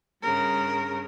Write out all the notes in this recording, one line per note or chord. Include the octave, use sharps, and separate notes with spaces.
G2 C#3 A#4